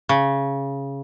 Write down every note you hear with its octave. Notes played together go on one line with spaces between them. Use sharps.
C#3